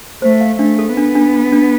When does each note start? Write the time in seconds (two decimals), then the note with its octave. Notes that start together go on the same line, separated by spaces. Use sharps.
0.22 A3 C5
0.41 F5
0.59 A3 D4
0.79 A4
0.97 B3 D4
1.15 D4
1.34 D4
1.52 D4